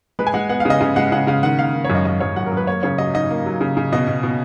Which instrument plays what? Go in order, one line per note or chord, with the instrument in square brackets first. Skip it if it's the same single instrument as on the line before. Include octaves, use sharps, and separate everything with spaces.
[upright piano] G#3 B4
G#5
G#3 F#5
B3 F#5
F5
C#3 D#5
C#3 D#5
G#3 F#5
C#3 F#5
C#3 F5
D#3 F#5
A#3 F5
D#3
C#5
F#2
D#5
F#2 D#5
F#2 C#5
F#2 F#5
A#4
F#2
B4
A#3 C#5
C#3 C#5
F#3 D#5
D#4 D#5
A#3
F#3
C#3
C#3
B2 D#5
B2
B2